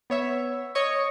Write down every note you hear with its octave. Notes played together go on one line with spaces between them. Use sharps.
B3 C#5 E5
C#5 D#5 C#6